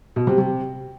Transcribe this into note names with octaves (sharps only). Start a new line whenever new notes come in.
B2
C3
C3